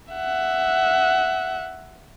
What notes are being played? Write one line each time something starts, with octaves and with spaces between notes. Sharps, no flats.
E5 F#5